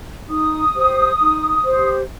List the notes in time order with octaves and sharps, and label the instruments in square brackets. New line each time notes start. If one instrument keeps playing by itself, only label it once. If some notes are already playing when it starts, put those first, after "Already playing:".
[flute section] D#4 D#6
G4 C5
D#4
G4 C5